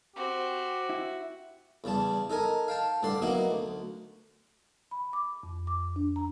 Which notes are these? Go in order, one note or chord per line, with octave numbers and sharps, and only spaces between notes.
C4 F#4 G4
E4
E2 C#3 G3 A5
D#4 A4 A#4 G#5
F5 G5 A5
A1 G2 D3 D5 C6
F#3 A#3 B3 D#4 E4
D2
B5
D6
F2
D6
D4
A#5